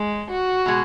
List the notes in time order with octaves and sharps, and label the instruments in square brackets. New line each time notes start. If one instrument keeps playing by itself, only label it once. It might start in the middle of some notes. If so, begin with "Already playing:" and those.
Already playing: [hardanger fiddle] G#3
F#4
[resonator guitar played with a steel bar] B2 G#3